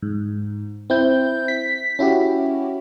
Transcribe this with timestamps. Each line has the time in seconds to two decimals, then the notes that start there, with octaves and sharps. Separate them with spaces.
0.02 G#2
0.90 C4 E4 G6
1.48 B6
1.99 C#4 E4 F#4 G4